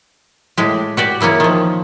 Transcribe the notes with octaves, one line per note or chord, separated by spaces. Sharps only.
A2 G#3 G4
F#4 G4 D5
C#3 E3 A#3 C#4
D#3 F3